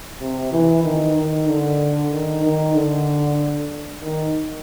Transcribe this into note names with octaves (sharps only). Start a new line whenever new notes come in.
C3
E3
D#3
D#3
D3
D#3
D#3
D3
D#3